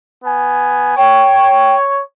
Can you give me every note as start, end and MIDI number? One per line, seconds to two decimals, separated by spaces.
0.24 0.95 59
0.24 0.95 80
0.97 2.00 73
0.97 1.75 79